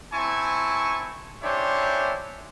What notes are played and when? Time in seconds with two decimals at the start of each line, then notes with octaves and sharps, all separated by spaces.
0.13 C4 E4 G#5 A5 C#6
1.43 C#4 D4 E4 G4 C5 C#5